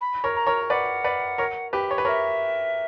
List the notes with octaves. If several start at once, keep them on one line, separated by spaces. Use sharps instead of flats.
B5
A#4 C#5
A#5
A#4 C#5
B4 D5 F#5
B4 D5
A#4 C#5
G4 B4
C#5
B4
A#4 C#5 E5